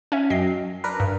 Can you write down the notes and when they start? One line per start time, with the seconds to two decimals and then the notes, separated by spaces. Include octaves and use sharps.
0.12 C#4 C#5 E5
0.30 F#2 D#5 G5 C7
0.84 D4 A#4 B4
1.00 G2